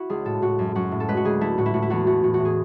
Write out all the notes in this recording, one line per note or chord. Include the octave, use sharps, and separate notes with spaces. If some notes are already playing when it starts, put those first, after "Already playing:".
Already playing: E4 F#4
C#2 G#4
A2 A4
A2 F#4
F#2
F#2 F#4
A2
A4
G#3 B4
F#4
D2 G#4
A3 E4
A2 F#4
E4
A2 F#4
E4
E2 F#4
A3 F#4
A2 F#4
F#4
A2
G#4